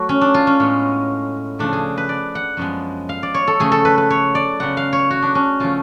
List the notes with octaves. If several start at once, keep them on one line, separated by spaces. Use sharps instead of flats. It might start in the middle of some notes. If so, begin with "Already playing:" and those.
Already playing: F#3 A3 F#4
C#4
D4
F4
C#4
A2 G#3 B3
C#3 F3 A3 D4
G#4
B4
D5
F#5
F#2 F3 G#3 B3
F5
D5
C#5
A4
C#3 F3 A3 G#4
A4
B4
B4
C#5
D5
C#3 F#3 B3 F#5
F5
C#5
F#4
D4
C#4
C#3 F3 A3 F4